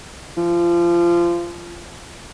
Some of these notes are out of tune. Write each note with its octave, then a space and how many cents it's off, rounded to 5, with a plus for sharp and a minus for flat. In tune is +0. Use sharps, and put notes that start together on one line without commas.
F3 -25